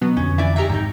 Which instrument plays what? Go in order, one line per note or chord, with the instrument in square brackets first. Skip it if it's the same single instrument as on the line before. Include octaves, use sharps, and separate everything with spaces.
[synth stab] B2 F#3 B3
[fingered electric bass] F2 D3 [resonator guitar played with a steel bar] C#4
[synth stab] E3 [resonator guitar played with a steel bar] D5 E5
[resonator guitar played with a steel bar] G#2 G#3 A#5 [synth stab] G4 E5
[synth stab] C2 D#3 [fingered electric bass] G#2 [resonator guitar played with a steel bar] C3 D#4